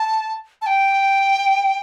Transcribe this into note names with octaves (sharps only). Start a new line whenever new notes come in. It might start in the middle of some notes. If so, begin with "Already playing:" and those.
Already playing: A5
A5
G5